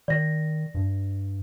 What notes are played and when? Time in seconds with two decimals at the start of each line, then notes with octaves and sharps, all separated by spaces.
0.08 D#3 D5 A#6
0.74 G2